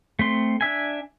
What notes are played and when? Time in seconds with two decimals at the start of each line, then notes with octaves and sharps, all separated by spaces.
0.19 A3 C4 C6
0.61 D4 E5 G#5